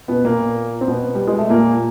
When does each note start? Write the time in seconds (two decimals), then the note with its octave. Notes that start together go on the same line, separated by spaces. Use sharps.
0.08 B2 B3
0.25 A#2 A#3
0.81 C4
0.87 B2 B3
1.15 G3
1.28 G#3
1.38 A3
1.50 A#2 A#3